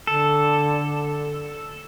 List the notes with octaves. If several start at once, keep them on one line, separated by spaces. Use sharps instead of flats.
D3 A4